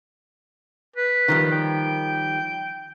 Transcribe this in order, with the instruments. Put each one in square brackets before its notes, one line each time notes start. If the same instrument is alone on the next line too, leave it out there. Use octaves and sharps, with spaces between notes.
[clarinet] B4
[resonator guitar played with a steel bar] D#3 F3 G3
[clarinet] G5